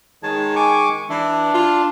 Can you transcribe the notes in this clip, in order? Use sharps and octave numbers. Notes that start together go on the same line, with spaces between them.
D#3 G#3 C#5 A5
G#5 C#6 D6
E3 D4
F4